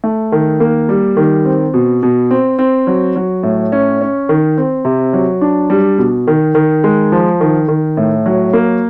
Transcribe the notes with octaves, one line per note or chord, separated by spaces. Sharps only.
A3
D#3
A#3
G3
D#3
C4
B2
B2
C4
C4
F#3
F#3
A2
C#4
C#4
D#3
C4
C3
F#3
D4
G3
B2
D#3
D#3
G#3
F3
D#3
D#3
A2
F#3
A#3